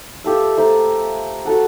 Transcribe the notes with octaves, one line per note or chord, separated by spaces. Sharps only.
F4 G4 A4 E5
A3 C5 A5 A#5
F#4 A4 F#5